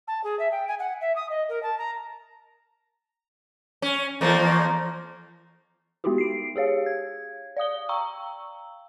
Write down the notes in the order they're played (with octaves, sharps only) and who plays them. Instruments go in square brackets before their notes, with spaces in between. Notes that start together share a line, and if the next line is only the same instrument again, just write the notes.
[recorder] A5
G#4
E5
G5
G#5
F#5
E5
D#6
D#5
A#4
A5
A#5
[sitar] C#4
E2 F3 A#3
[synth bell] G#3 B3 D#4 E4 F#4 G4
C7 D7
G4 G#4 C#5 F5
G#6
D5 F5 D#6 G7
F5 G5 A#5 C#6 E6